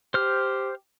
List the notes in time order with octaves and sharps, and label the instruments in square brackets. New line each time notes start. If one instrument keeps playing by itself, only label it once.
[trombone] G4 [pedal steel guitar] C5 F6